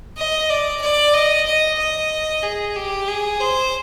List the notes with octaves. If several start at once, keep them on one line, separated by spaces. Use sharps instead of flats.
D#5
D5
D5
D#5
D#5
D#5
G#4
G4
G#4
C5